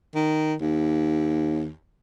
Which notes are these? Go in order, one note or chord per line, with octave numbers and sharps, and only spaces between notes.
D#3
D#2